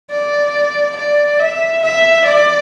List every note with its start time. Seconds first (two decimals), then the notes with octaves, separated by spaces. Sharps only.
0.11 D5
0.96 D5
1.39 E5
1.83 E5
2.25 D5